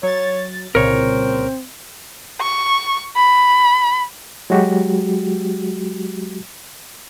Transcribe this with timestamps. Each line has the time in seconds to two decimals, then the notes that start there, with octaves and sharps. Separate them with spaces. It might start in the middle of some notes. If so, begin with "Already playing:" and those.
0.03 F#3 C#5 A6
0.75 C2 A#2 C#3 C4 A#4 C#5
2.41 C#6
3.16 B5
4.50 F#3 G#3 F#4 G4